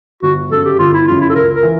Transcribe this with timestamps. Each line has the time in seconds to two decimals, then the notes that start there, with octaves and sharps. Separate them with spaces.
0.22 G1 F#4
0.51 F#2 C#3 A4
0.65 G4
0.79 G1 F4
0.94 E4
1.07 F#2 C#3 F4
1.21 E4
1.30 A4
1.35 C#2 A#4
1.54 A#4
1.63 E3